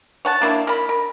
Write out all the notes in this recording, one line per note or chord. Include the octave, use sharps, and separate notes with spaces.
C#5 F#5 A5
A#3 D4 E4
A#4 B5
A#4